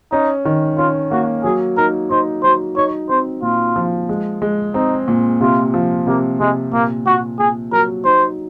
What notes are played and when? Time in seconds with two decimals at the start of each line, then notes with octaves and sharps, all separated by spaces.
0.12 C#4 D#4
0.45 D#3
0.78 C#4 F4
1.11 A#3 F#4
1.44 F#3 G#4
1.77 D#4 A#4
2.10 D#4 C5
2.43 F#3 C5
2.76 D#4 C#5
3.09 C4 C5
3.42 A#2 F4
3.76 F3
4.09 G#3
4.42 G#3
4.74 C4 D#4
5.08 A#2
5.41 C3 F4
5.74 F3
6.07 C3 A#3
6.40 C3 G#3
6.73 A#2 A#3
7.06 A#2 F#4
7.39 A#2 G#4
7.72 F#3 A#4
8.05 D#4 C5